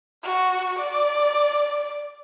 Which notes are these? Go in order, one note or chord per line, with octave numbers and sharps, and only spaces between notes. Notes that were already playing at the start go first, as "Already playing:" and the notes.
F#4
D5